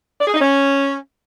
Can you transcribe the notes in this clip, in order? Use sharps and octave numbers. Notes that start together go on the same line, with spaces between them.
D5
G#4
D#4
C#4